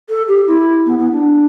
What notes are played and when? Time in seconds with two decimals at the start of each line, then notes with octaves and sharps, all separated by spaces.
0.09 A4
0.28 G4
0.47 E4
0.86 B3
0.99 B3
1.12 D4